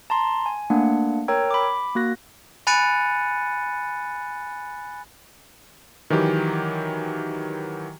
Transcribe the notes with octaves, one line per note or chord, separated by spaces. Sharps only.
A5 A#5 C6
G#5
A3 A#3 D4 F#5
A#4 C#5 G5 A#5 E6 G#6
B5 D6
A#3 F#4 F#6 A#6
G#5 B5 F#6 A6 C#7 D#7
D#3 E3 F#3 G4